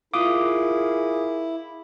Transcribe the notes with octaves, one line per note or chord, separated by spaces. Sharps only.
E4 F4 G#4 A#4 F5 D6 D#6